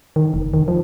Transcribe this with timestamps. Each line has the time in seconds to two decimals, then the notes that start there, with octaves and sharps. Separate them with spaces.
0.16 D#3
0.34 F1
0.54 D#3
0.68 F3